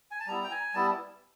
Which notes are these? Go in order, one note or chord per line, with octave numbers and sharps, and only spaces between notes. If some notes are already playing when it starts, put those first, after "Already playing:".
G#5
A5
G3 B3 E4 A#5
G5
G#5
G3 B3 E4 A5